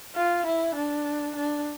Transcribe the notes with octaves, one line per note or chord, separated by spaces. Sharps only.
F4
E4
D4
D4